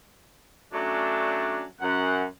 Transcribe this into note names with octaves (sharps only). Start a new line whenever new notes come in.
F#3 A3 C#4 D4
F#2 F#5